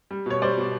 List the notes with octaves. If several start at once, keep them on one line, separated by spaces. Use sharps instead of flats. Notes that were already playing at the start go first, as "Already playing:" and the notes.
G3
B2 C#5
G3 C5 D5
B2